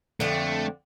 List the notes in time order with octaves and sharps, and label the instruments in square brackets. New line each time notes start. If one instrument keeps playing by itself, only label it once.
[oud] F2 D3 [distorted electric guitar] A3